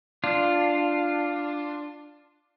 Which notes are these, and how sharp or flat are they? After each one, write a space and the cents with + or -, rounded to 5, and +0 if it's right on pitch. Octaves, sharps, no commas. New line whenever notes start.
D4 +5 F4 +0